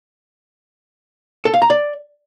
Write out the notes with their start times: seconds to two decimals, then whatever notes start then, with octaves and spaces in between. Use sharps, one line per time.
1.45 A4
1.54 F5
1.62 A#5
1.70 D5